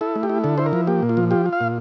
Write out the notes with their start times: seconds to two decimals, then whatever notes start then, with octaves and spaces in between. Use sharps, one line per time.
0.01 E4 A4
0.16 A3
0.23 G4
0.29 E4
0.44 D3 A4
0.58 E4 C5
0.66 A#4
0.73 F3
0.87 A#3 G4
1.02 A#2
1.09 F4
1.17 F3
1.31 F4 G4
1.46 F4
1.53 F5
1.61 A#2